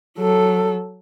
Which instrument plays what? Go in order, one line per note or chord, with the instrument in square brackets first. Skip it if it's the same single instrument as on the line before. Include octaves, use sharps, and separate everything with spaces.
[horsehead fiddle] F#3 A4